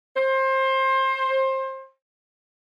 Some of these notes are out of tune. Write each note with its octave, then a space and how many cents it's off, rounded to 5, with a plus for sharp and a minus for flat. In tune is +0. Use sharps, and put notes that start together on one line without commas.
C5 +25